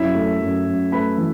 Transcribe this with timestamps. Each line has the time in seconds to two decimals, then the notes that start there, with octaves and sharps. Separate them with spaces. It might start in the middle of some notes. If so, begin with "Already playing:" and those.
Already playing: F#2 E4 E5
0.15 A3
0.41 F#2
0.66 F#2
0.92 A3 B4 B5
1.18 E3